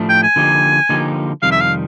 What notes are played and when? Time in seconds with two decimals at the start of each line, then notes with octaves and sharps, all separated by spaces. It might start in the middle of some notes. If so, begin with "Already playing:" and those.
Already playing: A2 F3 A3 D4
0.09 G5
0.23 G#5
0.36 D3 F3 A#3 D#4 G4
0.89 D3 F3 A#3 D#4 G4
1.42 F2 C3 D#3 G3 F5
1.52 E5
1.60 F5